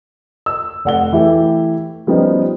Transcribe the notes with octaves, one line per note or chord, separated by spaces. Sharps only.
E6
F1 F#5 G7
E3 A3 E4 G4
F3 G3 B3 C#4 D#4